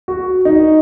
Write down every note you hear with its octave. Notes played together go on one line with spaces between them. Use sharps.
F#4
D#4